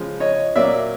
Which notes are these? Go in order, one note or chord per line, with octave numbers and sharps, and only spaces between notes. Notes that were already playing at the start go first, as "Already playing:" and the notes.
Already playing: C#3 F3 G#3
C#5 D#5
A#2 F#3 A#3 C#4 D5 E5